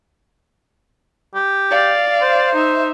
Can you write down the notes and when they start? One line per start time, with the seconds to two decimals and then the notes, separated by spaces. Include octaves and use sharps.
1.35 G4
1.70 D5 F5
2.22 C5
2.55 D#4 E5